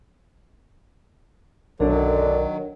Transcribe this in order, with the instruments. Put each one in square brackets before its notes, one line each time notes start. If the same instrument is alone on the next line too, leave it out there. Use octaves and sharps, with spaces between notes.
[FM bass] B1 [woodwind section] F#2 D3 [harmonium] D#3 F#3 [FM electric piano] D4 A#4